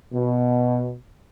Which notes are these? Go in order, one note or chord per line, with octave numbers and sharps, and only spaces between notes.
B2